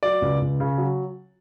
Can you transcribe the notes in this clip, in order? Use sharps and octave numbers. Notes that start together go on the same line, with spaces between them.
F#3 D5
C#2
C#2
C#3
F#3